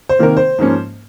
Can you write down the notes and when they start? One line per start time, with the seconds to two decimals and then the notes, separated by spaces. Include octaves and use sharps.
0.09 C5
0.19 C3 D#3 A#3 A#4
0.37 C5
0.59 G#2 F3 A#3 C#4